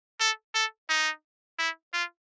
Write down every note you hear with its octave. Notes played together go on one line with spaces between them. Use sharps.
A4
A4
D#4
E4
F4